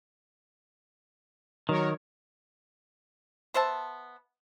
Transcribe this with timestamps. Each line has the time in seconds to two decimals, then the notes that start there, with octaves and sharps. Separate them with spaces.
1.69 D#3 F#3 A#4 C#5
3.54 B3 C5 E5 A5